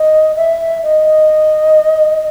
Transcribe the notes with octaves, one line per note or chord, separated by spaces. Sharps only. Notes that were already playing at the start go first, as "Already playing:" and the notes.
Already playing: D#5
E5
D#5